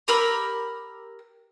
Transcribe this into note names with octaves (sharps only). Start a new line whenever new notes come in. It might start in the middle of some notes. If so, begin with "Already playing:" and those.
G4 A#4 B5 E6